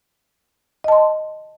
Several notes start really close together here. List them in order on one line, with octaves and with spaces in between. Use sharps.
D#5 A5 C6